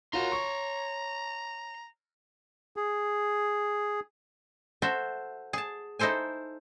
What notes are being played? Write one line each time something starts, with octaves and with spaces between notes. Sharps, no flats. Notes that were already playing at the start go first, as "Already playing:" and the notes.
F4 F#4 A#4 C#5 A#5 C6
C#6
G#4
F#4 A4 C5 E5
G#4 A5
D#4 E4 A4 C5 G#5